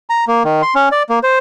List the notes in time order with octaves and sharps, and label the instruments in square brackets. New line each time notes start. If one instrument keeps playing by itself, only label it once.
[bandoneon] A#5
A#3
D#3
C6
C#4
D5
A#3
C5